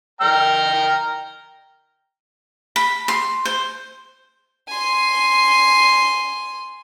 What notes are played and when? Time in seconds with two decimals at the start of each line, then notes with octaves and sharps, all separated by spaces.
0.21 G5 A#5 F6
2.76 B5
3.08 C6
3.45 C5
4.68 G#5 C6